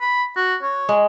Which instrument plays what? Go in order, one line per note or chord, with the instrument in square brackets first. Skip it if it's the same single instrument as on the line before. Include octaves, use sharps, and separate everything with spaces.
[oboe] B5
F#4
C#5
[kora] G#3